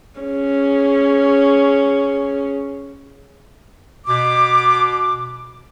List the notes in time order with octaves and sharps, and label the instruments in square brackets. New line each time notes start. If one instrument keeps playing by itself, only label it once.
[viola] C#4 G#4
[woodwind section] B2 D6